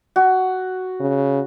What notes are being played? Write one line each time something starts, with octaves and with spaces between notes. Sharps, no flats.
F#4
C#3